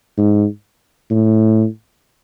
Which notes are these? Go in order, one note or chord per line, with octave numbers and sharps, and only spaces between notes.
G#2
A2